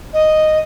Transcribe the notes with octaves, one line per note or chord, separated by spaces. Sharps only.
D#5